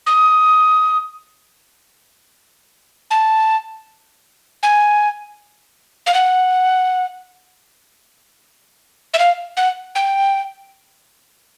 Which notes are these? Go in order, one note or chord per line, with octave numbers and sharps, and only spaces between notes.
D#6
A5
G#5
F5
F#5
E5
F5
F#5
G5